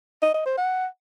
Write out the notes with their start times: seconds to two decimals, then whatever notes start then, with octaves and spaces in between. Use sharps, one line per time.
0.23 D#5
0.34 D#5
0.46 C5
0.58 F#5